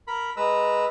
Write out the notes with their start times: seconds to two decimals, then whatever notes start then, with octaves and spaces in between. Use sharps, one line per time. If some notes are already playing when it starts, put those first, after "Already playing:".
0.07 A#4 B5
0.37 G#3 B4 A#5 E6